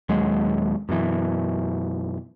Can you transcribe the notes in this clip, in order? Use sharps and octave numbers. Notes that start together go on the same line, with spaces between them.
D#1 D#2 F#3 G#3
F#2 B2 E3